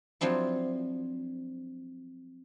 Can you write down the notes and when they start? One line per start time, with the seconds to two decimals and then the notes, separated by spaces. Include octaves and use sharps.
0.21 F3 F#3 C4 D4 E4